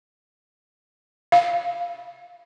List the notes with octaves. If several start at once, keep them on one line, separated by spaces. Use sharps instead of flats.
F5